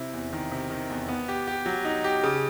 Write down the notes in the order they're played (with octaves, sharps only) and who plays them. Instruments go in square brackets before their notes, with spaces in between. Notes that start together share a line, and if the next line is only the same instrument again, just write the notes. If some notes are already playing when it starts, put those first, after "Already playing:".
Already playing: [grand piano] C3 E4
E2
D#3
C3
D#3
E2
B3
G4
G4
F#3
D#4
G4
C#3